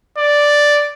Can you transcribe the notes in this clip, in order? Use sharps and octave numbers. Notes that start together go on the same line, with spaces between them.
D5